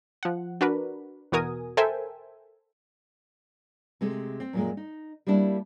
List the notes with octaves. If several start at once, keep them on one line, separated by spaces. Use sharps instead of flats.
F3 F#5
D4 F#4 A#4 B4
E2 B2 F#4 A#4 G#5 D#6
A4 A#4 C5 E5 G5 G#5
C3 G#3 A3
C4
F#2 A#2 G#3
D#4
G3 A#3 D4 E4